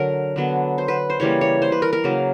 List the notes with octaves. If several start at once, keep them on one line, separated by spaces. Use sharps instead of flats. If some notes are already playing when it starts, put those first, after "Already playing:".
Already playing: D3 F#3 A#4
D3 F#3 B3
C5
B4
C5
C#3 E3 G3 A#3 C#5
C#5
C5
B4
A#4
A#4
C#3 F#3 A#3